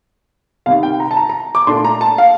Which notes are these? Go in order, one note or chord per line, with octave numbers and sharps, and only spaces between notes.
C2 C3 D#3 F5
G5
A#5
A5
A#5
A#5
D6
A#2 A3 D4 C6
A#5
A5
F5